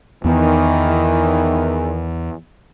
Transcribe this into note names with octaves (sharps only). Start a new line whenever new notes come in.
E2 D#3 E3 B3